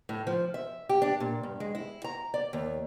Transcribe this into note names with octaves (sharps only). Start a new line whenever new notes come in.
A2
F3
E5
G4
D4
A#2
G2
G#3
E4
A#5
D5
D#2